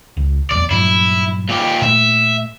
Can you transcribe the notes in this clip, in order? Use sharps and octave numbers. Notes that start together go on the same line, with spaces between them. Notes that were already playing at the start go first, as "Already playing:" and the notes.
C#2
A#1 E2 D5
G2 A#2 F#3 E4
A#2 G4
A#2 A3 E5